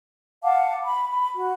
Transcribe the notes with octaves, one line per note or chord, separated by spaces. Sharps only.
F5 F#5 A5 D6
B5
B5
F#4